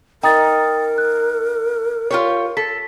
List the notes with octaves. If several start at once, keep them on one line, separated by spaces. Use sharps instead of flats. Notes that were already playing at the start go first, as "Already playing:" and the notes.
D#4 A#4 G5 D#6 A6
F#6
F4 G4 C#5
A4 B6